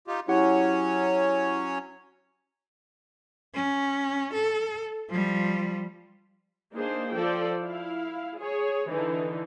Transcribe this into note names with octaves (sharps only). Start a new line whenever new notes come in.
D#4 F4 G4
F#3 C#4 E4 G4 C#5 F#5
C#4
A4
F3 G3
A#3 D4 D#4 G#4 C5
F3 A4 C5 D5 G5
E4 F5
G#4 C#5
D3 E3 D#4